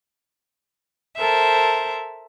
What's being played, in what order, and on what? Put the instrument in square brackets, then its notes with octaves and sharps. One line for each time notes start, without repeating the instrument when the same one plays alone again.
[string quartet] A4 A#4 C5 E5